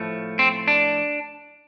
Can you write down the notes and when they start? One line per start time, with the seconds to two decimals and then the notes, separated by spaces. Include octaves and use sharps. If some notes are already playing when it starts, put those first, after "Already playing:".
Already playing: A2 F3 A3
0.39 C4
0.68 D4